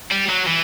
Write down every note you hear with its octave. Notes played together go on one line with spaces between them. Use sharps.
G3
F#3
E3